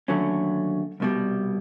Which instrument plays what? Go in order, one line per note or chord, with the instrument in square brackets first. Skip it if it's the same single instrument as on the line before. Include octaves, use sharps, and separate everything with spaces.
[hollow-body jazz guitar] D#2 D3 F#3 A3 C#4
C2 B2 G3